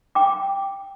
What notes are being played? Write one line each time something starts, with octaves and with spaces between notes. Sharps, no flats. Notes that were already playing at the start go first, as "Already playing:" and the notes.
G5 D6